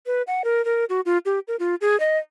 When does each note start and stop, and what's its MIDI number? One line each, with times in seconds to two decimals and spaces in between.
0.06 0.22 71
0.27 0.42 78
0.44 0.64 70
0.65 0.85 70
0.89 1.01 66
1.06 1.18 65
1.26 1.39 67
1.48 1.56 70
1.59 1.75 65
1.81 1.98 68
2.00 2.17 75